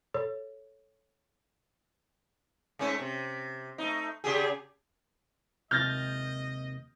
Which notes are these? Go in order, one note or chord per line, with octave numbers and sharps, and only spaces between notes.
A4 C#5
G#2 A3 C#4
C3
A3 D#4
C#3 G4 G#4
D#2 C3 D#5 F6 G6 A6 A#6